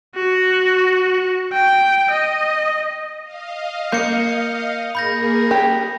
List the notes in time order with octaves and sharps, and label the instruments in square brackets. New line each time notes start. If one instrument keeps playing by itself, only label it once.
[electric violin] F#4
G5
D#5
[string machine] D#5 F5
[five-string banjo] A#3 [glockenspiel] G6 C#7
[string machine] A#3 G#4 A#4 [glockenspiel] B5 G6 A#6
[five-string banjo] G4